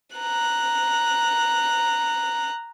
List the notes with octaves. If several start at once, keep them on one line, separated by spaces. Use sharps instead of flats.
A#5 F#6